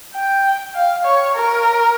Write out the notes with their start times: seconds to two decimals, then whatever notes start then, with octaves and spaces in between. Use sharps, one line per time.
0.15 G5
0.75 F5
1.05 C#5
1.36 A#4